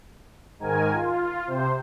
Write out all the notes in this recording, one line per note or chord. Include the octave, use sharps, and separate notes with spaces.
G#2 D#3 A#4 G#5
F4
C3 C5